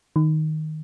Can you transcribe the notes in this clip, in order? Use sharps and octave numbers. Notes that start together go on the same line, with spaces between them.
D#3